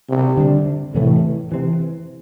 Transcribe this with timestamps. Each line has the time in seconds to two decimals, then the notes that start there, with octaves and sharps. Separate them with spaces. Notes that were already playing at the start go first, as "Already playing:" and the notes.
0.09 C3
0.37 D3 G3 D4
0.94 A2 C3 E3 A3
1.52 C3 E3 C4